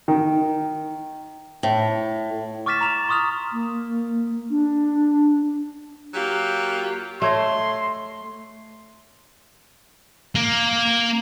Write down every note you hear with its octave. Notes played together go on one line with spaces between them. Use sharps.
D#3
A2
C#6 D6 F6 A6 B6 E7
A#5 E7 F7
C6 C#6 D#6 F6 F7
A#3
D4
F#3 A#3 F4 G4
A3 C#5 D#5 C6
A#3